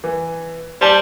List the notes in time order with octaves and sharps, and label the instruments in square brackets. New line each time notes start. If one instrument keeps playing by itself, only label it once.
[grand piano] E3
[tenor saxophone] G3 [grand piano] C5 A5 G7